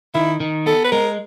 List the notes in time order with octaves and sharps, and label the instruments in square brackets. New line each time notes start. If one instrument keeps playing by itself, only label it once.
[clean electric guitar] D#3 [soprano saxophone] E4
[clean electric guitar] D#3
[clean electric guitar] B3 [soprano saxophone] A4
[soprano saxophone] B4
[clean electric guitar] G#3 [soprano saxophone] A#4